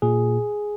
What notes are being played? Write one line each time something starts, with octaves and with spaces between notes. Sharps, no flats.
A#2 G#4